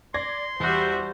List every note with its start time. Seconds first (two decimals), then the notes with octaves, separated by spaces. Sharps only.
0.14 D5 C6 G#6 A#6
0.60 E2 G3 F#4 C5 E5